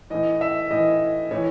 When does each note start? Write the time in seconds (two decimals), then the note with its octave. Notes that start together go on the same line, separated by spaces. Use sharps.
0.10 A2 E3 D#5
0.41 E5
0.71 A2 E3 D#5
1.31 A2 E3 C#5